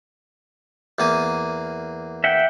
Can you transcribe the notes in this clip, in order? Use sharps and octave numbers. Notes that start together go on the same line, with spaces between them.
E2 A#3 G#5
E5 F#5 G5